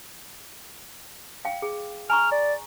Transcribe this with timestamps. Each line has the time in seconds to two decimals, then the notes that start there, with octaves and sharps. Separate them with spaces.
1.45 F5 G5
1.62 G#4
2.10 G#5 A#5 C#6 F6
2.32 D5